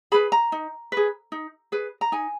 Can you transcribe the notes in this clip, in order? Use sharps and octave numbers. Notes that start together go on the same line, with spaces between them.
G#4 B4 B5
A#5
D#4
G#4 B4
D#4
G#4 B4
A#5
D#4 G#5